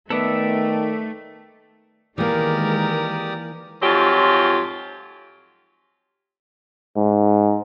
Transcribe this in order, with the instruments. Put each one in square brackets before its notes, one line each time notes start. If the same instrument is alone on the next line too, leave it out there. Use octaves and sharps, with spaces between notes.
[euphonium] D#3 [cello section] A3 [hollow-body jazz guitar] B3 [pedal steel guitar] A4 D5 E5
[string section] D#3 G#3 [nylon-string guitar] E3 A#3 [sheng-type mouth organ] G4 D5 D#6 [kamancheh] A#4
[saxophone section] F2 G#2 F#3 F4 G4
[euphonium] G#2